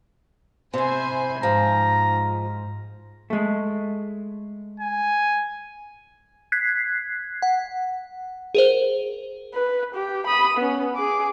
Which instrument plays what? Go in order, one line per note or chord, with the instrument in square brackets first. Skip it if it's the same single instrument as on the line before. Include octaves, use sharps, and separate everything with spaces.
[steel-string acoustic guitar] C3 E4 [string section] C5 G#5
[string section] G#2 [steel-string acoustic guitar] F3 [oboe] A#5
[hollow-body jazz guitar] G#3 A3
[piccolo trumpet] G#5
[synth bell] F#6 G#6 B6 C7
F#5
G#4 A#4 C5
[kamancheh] B4
G4
B5 D#6
B3 C#4
G#4 D6